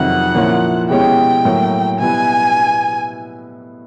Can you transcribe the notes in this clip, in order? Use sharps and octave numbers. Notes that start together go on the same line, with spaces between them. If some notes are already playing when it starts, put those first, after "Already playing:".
Already playing: F2 C3 D#3 F#3 F#5
A#2 F3 A#3 C#4 E4
B2 G#3 C#4 E4 G4 G5
A2 F#3 A#3
B2 G3 B3 E4 G#5